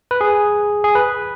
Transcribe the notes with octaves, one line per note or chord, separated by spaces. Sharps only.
B4
G#4
G#4
B4